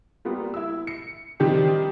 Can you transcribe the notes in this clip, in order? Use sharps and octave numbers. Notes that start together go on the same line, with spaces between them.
G3 A#3 B3 F4
E4 E6
C#7
C3 D#3 F3 G3 C4 G4